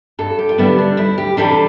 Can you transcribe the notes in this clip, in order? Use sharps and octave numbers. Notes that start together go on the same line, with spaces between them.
G2 A4
G4
F4
D3 G3 B3 E4
D4
D2 E4
G4
C3 E3 G3 D4 A4